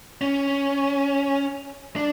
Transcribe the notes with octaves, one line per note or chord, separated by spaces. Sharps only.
C#4
D4